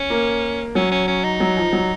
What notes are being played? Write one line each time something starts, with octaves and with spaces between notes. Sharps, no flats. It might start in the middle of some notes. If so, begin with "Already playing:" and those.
Already playing: C#4
A#3
F#3 C#4
C#4
C#4
D#4
F#3
F3
F#3